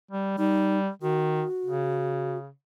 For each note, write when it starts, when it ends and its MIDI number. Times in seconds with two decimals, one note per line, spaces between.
0.11 0.35 55
0.38 0.89 55
0.38 0.78 63
1.02 1.44 51
1.02 2.37 66
1.65 2.50 49